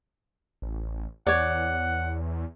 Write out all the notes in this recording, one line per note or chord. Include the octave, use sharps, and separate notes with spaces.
A1
E2 C#5 D5 F#5